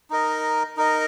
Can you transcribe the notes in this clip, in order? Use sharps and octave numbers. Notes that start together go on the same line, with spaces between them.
D#4 A#4 D#5
D#4 A#4 D#5